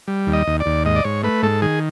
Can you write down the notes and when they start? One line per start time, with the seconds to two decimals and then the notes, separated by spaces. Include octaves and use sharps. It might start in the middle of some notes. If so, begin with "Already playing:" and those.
0.08 G3
0.27 D#2
0.33 D#5
0.47 D#2
0.60 D5
0.66 D#2
0.86 G#2 D#5
0.96 D5
1.04 G#2 C#5
1.23 A3 B4
1.43 G#2 A4
1.62 D#3 G#4